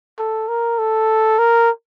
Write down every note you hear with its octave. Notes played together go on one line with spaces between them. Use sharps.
A4
A#4
A4
A#4